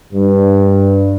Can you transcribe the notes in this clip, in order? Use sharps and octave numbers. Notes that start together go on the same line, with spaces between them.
G2